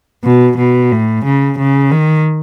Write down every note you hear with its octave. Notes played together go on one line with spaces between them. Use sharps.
B2
B2
A2
C#3
C#3
D#3